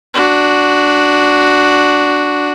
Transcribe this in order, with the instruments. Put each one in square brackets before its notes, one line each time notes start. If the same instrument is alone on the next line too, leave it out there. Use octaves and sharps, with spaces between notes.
[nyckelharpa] D4 F#4